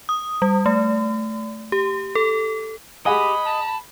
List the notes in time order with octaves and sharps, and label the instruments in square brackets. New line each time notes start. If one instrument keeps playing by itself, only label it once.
[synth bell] D#6
G3
A3
G4
A4
[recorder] G4 [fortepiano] G#4 F#5 G#5 [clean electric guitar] D#5 [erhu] B5
[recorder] A5